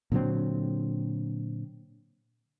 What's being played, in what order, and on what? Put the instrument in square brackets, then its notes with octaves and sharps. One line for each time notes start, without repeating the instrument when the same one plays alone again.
[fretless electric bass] A#2 D3 F#3 C4